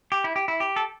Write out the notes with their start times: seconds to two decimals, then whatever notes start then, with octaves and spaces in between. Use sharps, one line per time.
0.12 G4
0.24 E4
0.36 G4
0.48 E4
0.60 G4
0.76 A4